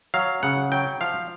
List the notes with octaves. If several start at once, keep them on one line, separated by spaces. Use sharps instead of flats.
F#3 F5
C#3 F#5
F#3 G5
F3 F5